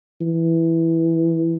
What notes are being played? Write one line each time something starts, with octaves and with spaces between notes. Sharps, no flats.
E3